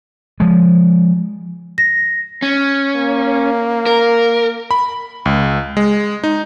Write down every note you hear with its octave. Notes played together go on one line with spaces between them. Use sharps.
F3 G#3
A#6
C#4
A#3
A#4
B5
C#2
G#3
D#4